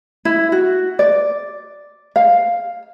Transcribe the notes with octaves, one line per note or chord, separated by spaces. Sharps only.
E4
F#4
D5
F5